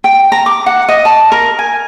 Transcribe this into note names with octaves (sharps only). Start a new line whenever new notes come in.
G5
A#5
D6
F#5
D#5
A5
A#4
G#5